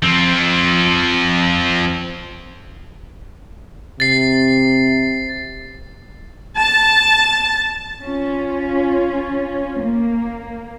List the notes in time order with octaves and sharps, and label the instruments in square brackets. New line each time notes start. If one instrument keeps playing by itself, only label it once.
[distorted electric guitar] F3 C4
[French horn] C3 [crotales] A6 C7
[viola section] A5
[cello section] C#4 F4
A#3